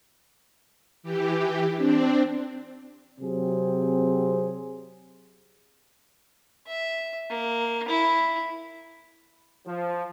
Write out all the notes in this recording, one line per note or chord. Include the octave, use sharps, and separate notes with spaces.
E3 G4
C4 D4
C3 F#3 C4 G#4
E5
A#3
E4
F3